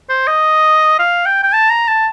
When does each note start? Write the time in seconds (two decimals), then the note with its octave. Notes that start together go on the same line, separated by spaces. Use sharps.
0.09 C5
0.27 D#5
0.99 F5
1.26 G5
1.43 G5
1.53 A5
1.70 A#5
1.88 A5